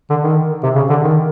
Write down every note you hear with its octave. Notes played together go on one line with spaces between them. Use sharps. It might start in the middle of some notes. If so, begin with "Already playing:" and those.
D3
D#3
C3
C#3
D3
D#3